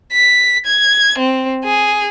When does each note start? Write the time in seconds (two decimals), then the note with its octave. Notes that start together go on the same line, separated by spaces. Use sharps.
0.12 B6
0.66 G#6
1.18 C4
1.64 G#4